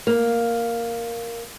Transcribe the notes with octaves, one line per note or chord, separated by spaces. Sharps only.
A#3